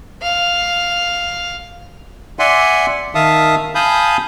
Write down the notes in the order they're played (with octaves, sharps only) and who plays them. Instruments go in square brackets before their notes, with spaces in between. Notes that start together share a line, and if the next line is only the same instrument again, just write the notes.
[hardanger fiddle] F5
[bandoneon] D5 E5 F#5 G#5 C6
D#3 E5 F5 A5 D#6
F5 G#5 A5 B5 D#6 G6